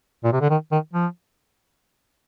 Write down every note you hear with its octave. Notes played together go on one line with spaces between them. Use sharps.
A#2
C3
D3
D#3
D#3
F3